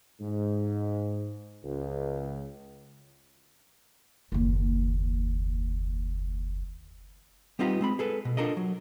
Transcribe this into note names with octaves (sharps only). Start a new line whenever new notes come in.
G#2
C#2
F#1 D#2
G3 B3 C4 D#4 F4 G4
G#3 C4 B5
G#4 A4 B4
B2
D4 F4 A4 A#4 D#5
F#3